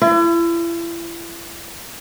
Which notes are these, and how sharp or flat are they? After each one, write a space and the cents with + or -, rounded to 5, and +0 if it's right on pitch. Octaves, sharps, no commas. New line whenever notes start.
E4 +40